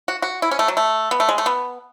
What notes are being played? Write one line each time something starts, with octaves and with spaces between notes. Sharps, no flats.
F#4
F#4
E4
C#4
A3
F#3
A3
B3
A3
G#3
A3
B3